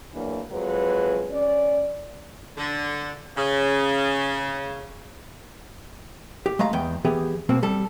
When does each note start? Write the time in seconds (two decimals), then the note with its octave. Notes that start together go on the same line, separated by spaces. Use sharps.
0.13 E2 E3 F#3 A#3 D4
0.51 F2 F#3 G#3 B4
1.29 C#4 D5
2.57 D3
3.36 C#3
6.46 G4
6.59 G#3 A3 F5 A#5
6.73 E2 B3 G5
7.05 E3 B3 G4 G#4
7.49 B2 A#3 C4 F#4
7.63 G3 A4